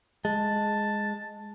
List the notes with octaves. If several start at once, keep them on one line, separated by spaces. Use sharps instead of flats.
G#3 A5